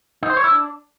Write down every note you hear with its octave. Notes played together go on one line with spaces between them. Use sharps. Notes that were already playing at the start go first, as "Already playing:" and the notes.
D#4
C5
C#5
E4
D4